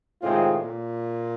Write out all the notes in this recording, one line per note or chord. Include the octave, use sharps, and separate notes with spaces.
A2 C3 D#3 G#3 C4 F4
A#2